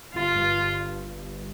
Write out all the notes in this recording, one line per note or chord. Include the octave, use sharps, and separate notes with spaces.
G1 F4
G2
G2